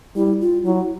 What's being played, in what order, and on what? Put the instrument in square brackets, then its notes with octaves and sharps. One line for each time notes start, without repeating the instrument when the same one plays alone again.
[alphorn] G3 [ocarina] E4
[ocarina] F4
[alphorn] F#3 [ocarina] E4